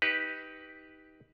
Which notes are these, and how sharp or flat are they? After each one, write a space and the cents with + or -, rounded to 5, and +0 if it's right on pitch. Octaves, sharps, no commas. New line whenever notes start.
D#4 +20 G4 +0 B4 +0